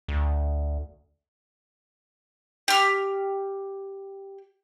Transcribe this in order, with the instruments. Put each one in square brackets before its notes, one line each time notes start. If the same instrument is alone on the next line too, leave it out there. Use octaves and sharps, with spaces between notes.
[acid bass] D2
[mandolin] G4 F6